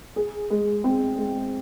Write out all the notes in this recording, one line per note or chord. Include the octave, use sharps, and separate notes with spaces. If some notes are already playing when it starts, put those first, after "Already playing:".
G#4
G#3
C4
G#3